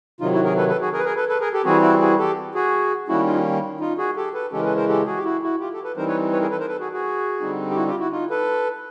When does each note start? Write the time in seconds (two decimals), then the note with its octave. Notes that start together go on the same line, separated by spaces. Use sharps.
0.20 C3 D#3 F#3 D#4 F4
0.32 E4 F#4
0.44 G#4 A#4
0.57 A4 B4
0.68 A4 B4
0.81 F#4 G#4
0.93 G#4 A#4
0.99 B4
1.04 G#4 A#4
1.16 A4 B4
1.28 A4 B4
1.40 G#4 A#4
1.53 G4 A4
1.65 E3 G3 C4 F#4 G#4
1.82 E4 F#4
2.01 F#4 G#4
2.18 G4 A4
2.55 F#4 G#4
3.08 D#3 G3 A#3 C#4 E4 F#4
3.26 D#4 F4
3.80 D#4 F4
3.98 F#4 G#4
4.16 G4 A4
4.34 A4 B4
4.52 C#3 E3 G#3 C#4 G4 A4
4.59 A#4
4.64 A4 B4
4.76 A#4 C5
4.88 G4 A4
5.06 F#4 G#4
5.16 G4
5.24 E4 F#4
5.43 E4 F#4
5.60 F4 G4
5.73 G4 A4
5.84 A4 B4
5.96 E3 G3 C4 D#4 A#4 C5
6.08 B4 C#5
6.32 B4 C#5
6.40 G#4 A#4
6.51 A4 B4
6.60 A#4 C5
6.68 A4 B4
6.80 F#4 G#4
6.92 F#4 G#4
7.40 D3 G3 C4 D#4
7.70 G4
7.75 E4 F#4
7.87 F4 G4
7.99 E4 F#4
8.11 D#4 F4
8.30 A4 B4